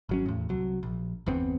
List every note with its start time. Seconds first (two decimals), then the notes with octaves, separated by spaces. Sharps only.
0.09 G#1 F#3 C#4
0.26 E2 A2
0.49 C2 F#3
0.83 A#1
1.26 G1 E2 B3 C4